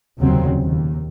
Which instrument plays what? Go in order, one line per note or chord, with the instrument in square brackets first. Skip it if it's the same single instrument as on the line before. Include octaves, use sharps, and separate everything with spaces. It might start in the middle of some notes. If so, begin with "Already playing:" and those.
[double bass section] F1 D#2 A#2 C#3 F#3 C4
D#2